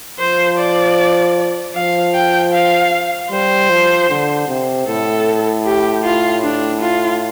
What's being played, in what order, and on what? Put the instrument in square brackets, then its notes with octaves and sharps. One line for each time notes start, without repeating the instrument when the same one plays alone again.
[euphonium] F3 [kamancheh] C5
[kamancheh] D5
[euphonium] F3 [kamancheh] F5
[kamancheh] G5
F5
[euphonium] G3 [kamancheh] C5
[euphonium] F3
D3
C3
[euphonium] A2 [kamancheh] A4
[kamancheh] G4
F4
D4
F4